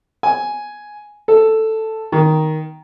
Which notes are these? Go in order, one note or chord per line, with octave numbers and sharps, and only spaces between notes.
G#5
A4
D#3